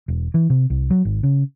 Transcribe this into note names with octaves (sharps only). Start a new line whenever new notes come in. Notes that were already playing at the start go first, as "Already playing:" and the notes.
E1
E3
C3
C2
F#3
G#1
C#3